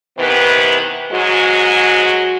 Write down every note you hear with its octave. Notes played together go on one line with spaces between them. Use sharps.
C3 D#3 E3 B3 B4
G#2 F#3 G#3 F#4